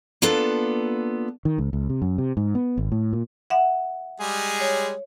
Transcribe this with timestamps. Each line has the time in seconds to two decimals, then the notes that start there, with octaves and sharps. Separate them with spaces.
0.22 A#3 B3 D4 F4 A4
1.45 D#3
1.58 C#2
1.73 C#2
1.90 C3
2.02 F#2
2.18 C3
2.37 G#2
2.55 B3
2.77 G#1
2.92 A2
3.13 A#2
3.50 E5 F#5
4.20 G3 G#3 G#4
4.60 C#5